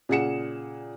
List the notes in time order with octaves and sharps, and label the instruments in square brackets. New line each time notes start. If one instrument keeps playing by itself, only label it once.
[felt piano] A#2 C#3 G#4 F#5 C#7 E7